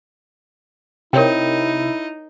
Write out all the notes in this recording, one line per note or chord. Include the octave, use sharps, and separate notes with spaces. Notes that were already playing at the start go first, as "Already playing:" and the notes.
C3 D#4 E4 A#4 C#5 G5